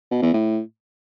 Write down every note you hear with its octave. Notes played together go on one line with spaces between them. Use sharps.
B2
E2
A2